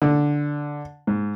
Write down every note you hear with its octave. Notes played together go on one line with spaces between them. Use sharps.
D3
G#2